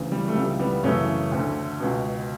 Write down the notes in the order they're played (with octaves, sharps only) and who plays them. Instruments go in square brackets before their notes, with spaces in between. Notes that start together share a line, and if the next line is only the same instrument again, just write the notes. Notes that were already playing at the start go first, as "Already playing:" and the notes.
Already playing: [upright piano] D2 C#3 E3
G3
A3
C#2 C#3 E3 G3
G3 B3
F#2 C#3 E3 A3 C#4
D2 D3
C#2 B2